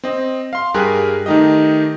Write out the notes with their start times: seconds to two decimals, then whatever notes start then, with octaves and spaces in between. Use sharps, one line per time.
0.04 C4 D#5
0.53 F5 C6
0.74 G2 G4 G#4 A#4 G#5 F#6
1.26 D#3 A3 D#4 G4 D#5